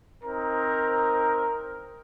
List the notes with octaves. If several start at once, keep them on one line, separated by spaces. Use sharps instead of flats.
C4 D#4 A#4